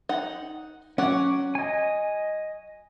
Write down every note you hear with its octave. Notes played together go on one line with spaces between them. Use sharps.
D#4 F#5
F#3 C#4 F#5 D6
D#5 G#5